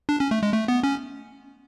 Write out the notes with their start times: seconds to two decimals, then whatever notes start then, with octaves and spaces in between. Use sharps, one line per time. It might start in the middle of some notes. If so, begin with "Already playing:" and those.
0.09 D4
0.20 C#4
0.31 A3
0.43 G#3
0.54 A3
0.68 B3
0.83 C#4